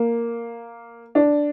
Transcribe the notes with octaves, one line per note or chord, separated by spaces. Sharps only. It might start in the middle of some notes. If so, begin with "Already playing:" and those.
Already playing: A#3
D4